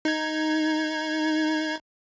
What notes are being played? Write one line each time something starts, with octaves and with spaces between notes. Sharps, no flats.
D#4 G#6